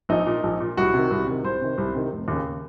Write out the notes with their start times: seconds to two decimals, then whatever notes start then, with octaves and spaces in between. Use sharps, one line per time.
0.09 A#1 D#4
0.26 A#2
0.43 A#1
0.60 A#2
0.77 C2 F#4
0.94 C3 D#3
1.11 C2
1.27 C3 D#3
1.44 C2 C5
1.61 C3 D#3
1.78 C2
1.95 C3 D#3
2.12 F1
2.28 D#2 C#3